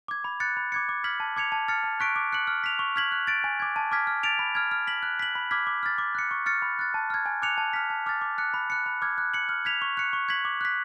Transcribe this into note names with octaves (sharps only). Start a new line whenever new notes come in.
D6 G#6
B5
F#6 A6 C#7
B5
D6 G#6 C#7
D6
F6 G#6 B6 F#7
A5
D6 G#6 C#7 F7
A5
F6 A6 C#7
A5
C#6 F#6 B6 D7
D6
F#6 C#7 F#7
F6
B6 F7
C#6
F6 G#6 B6 F#7
F#6
A6 D7
G#5
D6 G#6
A5
D6 F6 G#6 B6
F6
A6 D7 F7
B5
F6 G#6
F6
B6 F#7
F#6
B6 F#7
B5
D6 F6 G#6 B6
D6
F6 A6
D6
F#6 C#7
C#6
F6 A6 C#7
B5
F#6 A6
A5
F6 G#6
G#5
D6 F#6 C#7 F7
A5
F6 B6
A5
D6 F6 A6
D6
F#6 C#7
B5
F#6 C#7
B5
D6 F6 G#6
F#6
C#7 F#7
F6
G#6 B6 F7
C#6
F#6 C#7
C#6
G#6 B6 F#7
D6
F#6 B6